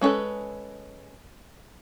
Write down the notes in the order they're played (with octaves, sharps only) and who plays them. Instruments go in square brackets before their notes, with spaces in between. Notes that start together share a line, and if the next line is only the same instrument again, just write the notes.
[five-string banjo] G#3 C#4 D#4 A4 B4